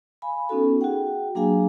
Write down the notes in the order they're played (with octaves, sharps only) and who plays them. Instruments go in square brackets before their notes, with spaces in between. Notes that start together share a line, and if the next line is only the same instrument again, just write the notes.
[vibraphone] F5 G#5 B5
B3 C#4 D#4 F#4 A4
F#4 G#4 F#5 G5
F#3 A#3 D4 G#4 F5 G#5